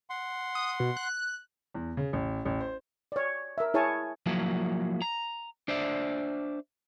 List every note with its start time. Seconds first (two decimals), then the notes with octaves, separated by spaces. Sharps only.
0.10 F#5 C6
0.55 D#6
0.80 B2
0.97 F#6
1.74 E2
1.97 C#3
2.13 A1
2.45 A1
2.61 C5
3.12 C#5 D5
3.58 A#4 E5
3.74 E4 G#4 C#5 G#5 A5
4.26 F3 F#3 A#3 E4
5.02 A#5
5.68 D4 C5 D5 E5